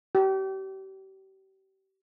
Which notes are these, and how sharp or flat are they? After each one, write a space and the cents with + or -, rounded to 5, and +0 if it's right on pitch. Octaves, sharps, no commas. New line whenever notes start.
G4 -35